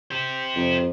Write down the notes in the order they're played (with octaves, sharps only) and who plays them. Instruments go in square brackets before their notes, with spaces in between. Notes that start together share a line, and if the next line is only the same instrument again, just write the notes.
[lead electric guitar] G4 C5
[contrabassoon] F2